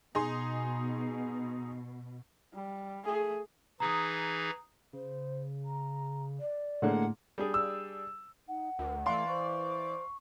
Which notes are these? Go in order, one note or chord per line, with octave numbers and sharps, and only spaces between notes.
B2 D#4 G#4 C6
G3
A3 G#4
E3 D#4 G#4 A#5 D#6
C#3 C5
A#5
D5
A2 D3 G#3 A#3 F#5
G3 D4 G#4
E6
D#4 F#5
D2 A#4
E3 A3 D5 F5 C6
C5 C#6